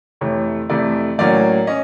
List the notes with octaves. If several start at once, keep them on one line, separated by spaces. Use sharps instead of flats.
F2 C3 E3 A3 C#5
F2 C3 E3 A3 D5
A2 F#3 A#3 C#4 D5
C#4 D#5